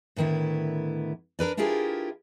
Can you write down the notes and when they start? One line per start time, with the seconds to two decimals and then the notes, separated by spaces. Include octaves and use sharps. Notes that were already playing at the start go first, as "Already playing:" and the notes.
0.16 A2 D3 D#3 B3 E4
1.39 D4 A#4 B4 D5
1.57 D4 E4 F4 G4 G#4 A#4